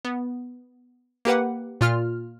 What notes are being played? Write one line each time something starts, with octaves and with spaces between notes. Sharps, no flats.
B3
A#3 G4 B4 F#5
A#2 F4 F6